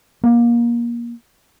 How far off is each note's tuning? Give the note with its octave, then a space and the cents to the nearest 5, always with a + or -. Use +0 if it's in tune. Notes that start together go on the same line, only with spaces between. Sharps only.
A#3 +25